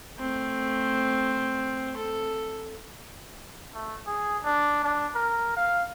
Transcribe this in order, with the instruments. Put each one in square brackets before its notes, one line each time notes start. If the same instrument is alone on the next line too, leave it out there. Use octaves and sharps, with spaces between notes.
[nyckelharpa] A3 C4
A4
[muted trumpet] A3
G#4
D4
D4
A#4
F5